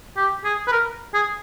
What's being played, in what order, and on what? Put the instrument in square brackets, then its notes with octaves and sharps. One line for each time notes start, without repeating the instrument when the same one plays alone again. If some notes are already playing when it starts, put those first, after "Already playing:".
[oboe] G4
G#4
B4
A#4
G#4